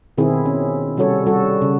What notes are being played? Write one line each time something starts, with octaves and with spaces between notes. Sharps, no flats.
B2 D#3 C4 E4 G#4
C#4
C3 G3 C#4 F#4 A4 C#5
G3 F#4 A4
C#3